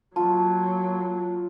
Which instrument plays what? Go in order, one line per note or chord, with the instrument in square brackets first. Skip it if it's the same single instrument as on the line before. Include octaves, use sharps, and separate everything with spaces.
[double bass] F#3 A#3 [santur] F4 [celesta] A5